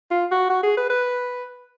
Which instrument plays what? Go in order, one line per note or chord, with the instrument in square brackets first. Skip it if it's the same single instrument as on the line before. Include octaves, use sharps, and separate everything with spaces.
[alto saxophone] F4
F#4
F#4
G#4
B4
B4